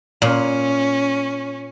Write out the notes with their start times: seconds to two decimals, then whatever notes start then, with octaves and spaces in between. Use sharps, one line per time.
0.22 A#2 C#4